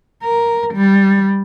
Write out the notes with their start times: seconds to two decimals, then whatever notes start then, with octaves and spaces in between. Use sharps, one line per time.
0.23 A#4
0.74 G3